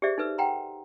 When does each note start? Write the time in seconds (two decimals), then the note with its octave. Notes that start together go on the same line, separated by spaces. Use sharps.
0.02 G4 G#4 C5 D5 E5
0.18 D#4 A4 B4 E6
0.38 F#5 G5 A#5 C6